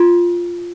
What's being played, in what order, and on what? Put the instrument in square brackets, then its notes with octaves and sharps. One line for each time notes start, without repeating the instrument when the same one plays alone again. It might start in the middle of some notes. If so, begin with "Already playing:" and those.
Already playing: [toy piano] F4